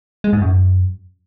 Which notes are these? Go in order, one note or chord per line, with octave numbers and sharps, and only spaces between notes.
G#3
G#2
F#2